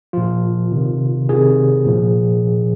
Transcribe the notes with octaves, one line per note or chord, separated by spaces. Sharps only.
A#2 F3 F4
C3 D#3
C3 D#3 G#4
A#2 F3